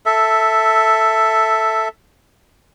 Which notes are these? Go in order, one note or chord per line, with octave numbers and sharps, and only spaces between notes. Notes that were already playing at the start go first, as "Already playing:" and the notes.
A4 E5